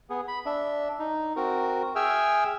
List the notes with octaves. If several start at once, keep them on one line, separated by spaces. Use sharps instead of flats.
B3 G#4
B5
D4 E5
D#4
C4 F#4 A#4
G#4 E5 G5 G#5 E6 F6